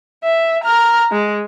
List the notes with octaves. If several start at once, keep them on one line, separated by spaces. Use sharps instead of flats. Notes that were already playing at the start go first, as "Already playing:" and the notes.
E5
A#5 F6
G#3